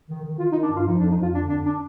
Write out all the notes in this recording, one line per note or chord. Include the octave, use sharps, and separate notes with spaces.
D#3
D#3
D#3 F4
D#4
D#3
D4
G2
F4
F3 D#4
D4
F2
D#4
F2 F4
D3 D4
F2 D4
D4